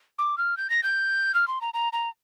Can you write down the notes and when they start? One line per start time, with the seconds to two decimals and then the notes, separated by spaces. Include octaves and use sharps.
0.19 D6
0.38 F6
0.57 G6
0.70 A#6
0.83 G6
1.34 F6
1.48 C6
1.61 A#5
1.74 A#5
1.93 A#5